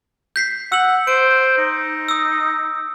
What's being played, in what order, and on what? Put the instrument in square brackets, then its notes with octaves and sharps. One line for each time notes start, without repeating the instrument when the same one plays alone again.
[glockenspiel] G6 B6 C7
[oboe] F#5 [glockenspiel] E6 F#7
[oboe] C5 [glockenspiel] D7
[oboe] D#4
[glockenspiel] D#6 E6